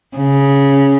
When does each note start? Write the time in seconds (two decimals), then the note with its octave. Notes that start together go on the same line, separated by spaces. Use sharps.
0.17 C#3